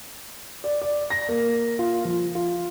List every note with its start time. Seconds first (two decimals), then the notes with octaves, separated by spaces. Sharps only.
0.64 D5
0.82 D5
1.10 A#6
1.29 A#3
1.79 F4
2.05 F3
2.35 F4